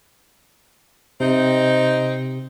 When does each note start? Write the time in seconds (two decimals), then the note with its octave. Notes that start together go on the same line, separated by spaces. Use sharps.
1.20 C3 C4 D#4